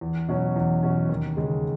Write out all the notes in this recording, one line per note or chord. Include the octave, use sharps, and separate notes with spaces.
E2
B2 F#3 C#4
E2
B2 F#3 C#4
D#2
C#3 G#3